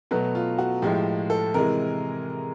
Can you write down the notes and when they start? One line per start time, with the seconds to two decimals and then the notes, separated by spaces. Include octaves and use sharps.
0.11 B2 F#3 A3 B4
0.35 F4
0.58 F#4
0.82 A2 F3 G#3 G4
1.30 A4
1.54 C3 E3 G#3 A#4